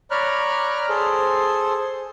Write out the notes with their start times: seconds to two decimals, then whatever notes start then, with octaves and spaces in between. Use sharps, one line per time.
0.11 C#5 D5 A#5 B5 F6 F#6
0.89 G#4 A4 C5